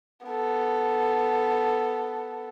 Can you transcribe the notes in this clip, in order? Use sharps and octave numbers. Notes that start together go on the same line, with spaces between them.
B3 A4